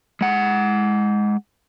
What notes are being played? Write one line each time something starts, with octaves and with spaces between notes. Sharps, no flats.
G#3 F#5